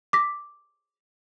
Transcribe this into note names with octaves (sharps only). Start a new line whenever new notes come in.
D6 A#6 B6